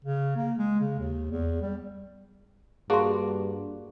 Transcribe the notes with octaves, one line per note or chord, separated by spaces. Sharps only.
C#3
A#3
G#3
C#3
D#2
E2
G3
G2 A#3 D4 F#4 G#4 C6